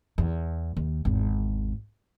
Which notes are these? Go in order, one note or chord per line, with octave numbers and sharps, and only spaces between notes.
E2
D#2
G#1 E2